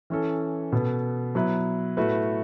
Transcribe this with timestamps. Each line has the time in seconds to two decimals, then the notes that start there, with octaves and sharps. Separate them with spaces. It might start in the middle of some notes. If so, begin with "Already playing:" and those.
0.10 E3 C#4 A4
0.72 B2 B3 A4
1.35 F#3 B3 E4 B4
1.97 A2 A3 F#4 B4